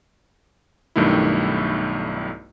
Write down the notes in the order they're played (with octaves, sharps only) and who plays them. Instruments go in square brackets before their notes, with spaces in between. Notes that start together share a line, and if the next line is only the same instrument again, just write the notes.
[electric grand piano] B1 G2 D#3 A3 E4